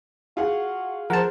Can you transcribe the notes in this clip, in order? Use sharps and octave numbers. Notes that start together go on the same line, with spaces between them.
F4 F#4 G#4 F#5
F3 G#4 A#4 C5 F#5 A5 A#5